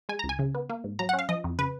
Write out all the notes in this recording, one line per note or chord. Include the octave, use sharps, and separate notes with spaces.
G#3 G#5
A#5
C#2
G#5
C#3
B3
A#3
G#2
F#3 A#5
F#5
C#4
F5
F3 D#5
F2
C#3 B4